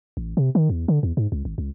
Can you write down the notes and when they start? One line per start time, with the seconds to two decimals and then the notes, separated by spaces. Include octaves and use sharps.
0.17 A1
0.37 C3
0.55 D#3
0.70 E2
0.88 D3
1.03 E2
1.17 G#2
1.32 C#2
1.45 G#1
1.58 C#2